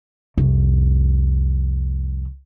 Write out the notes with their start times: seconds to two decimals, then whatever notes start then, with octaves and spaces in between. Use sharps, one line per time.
0.38 C2 F2